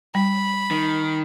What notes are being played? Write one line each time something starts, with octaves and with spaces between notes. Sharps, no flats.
G3 B5
D#3